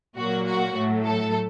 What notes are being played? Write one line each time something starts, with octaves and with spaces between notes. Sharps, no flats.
A#2 F#3 A#3 F#4
F#4
A2 F#3 A3
A4